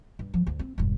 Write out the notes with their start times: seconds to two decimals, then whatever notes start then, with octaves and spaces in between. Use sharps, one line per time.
0.19 G2
0.34 F3
0.47 D2
0.59 C4
0.78 E1 G2